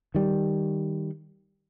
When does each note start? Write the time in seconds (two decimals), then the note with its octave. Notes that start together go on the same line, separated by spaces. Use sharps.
0.15 D#3 G3